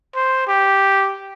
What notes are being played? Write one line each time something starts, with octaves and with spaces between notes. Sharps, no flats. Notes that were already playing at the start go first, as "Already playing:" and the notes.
C5
G4